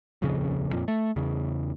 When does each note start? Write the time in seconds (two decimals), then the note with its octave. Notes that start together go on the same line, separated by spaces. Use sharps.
0.22 D#1 A#1 F2 C#3
0.73 F2 A#2
0.88 A3
1.16 E2 C#3